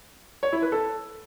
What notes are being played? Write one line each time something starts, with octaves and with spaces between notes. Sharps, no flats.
C#5
E4
B4
A4